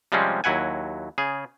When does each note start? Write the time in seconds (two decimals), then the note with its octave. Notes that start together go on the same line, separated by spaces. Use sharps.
0.12 C3 F3 G3 G#3 C4 C#4
0.44 D#2 F#3 E4 F#5 G#5
1.18 C#3 G#4